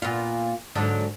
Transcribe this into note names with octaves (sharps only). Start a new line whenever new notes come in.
A#2 B3 F4
G#2 D3 F#3